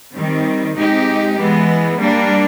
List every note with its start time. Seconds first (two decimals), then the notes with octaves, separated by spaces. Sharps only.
0.16 D#3 G3 C4
0.78 G#3 C4 D#4 G4
1.39 E3 G#3 B3
2.00 G3 A#3 D4